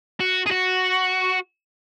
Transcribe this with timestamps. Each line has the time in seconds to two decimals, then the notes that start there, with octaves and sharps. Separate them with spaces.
0.20 F#4
0.46 G#4
0.51 F#4